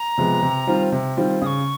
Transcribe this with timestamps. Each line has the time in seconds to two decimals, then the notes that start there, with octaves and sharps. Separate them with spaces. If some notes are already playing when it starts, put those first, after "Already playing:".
Already playing: A#5
0.18 C3 F3 G#3 B3
0.43 C3
0.67 D#3 G3 C4 F4
0.92 C3
1.17 D#3 G3 C4 F4
1.42 C#3 D#6
1.46 C#6